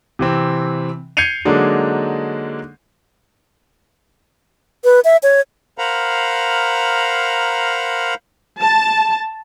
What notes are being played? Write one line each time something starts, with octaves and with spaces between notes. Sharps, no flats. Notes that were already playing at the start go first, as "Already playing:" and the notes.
C3 E3 C4
G6 G#6 C7 C#7 D#7 F7
D3 F#3 G#3 A#3 D4 D#4
B4
E5
C#5
A#4 C5 F5 F#5 A#5 B5
A5